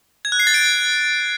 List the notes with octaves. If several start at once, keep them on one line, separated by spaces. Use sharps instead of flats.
G#6
F#6
C7
A6
D7